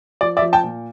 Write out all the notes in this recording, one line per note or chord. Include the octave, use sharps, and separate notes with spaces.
F3 D5
D5 E5
F3
G5 A5
A#2